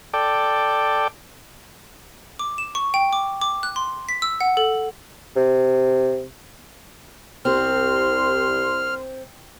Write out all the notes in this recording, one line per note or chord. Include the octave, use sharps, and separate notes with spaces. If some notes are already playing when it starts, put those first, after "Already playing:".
A4 D5 G5
D6
E7
C#6
G5
D6
D6
F#6
C6
B6
E6
F#5
A4
C3
C2 C4 C6 F6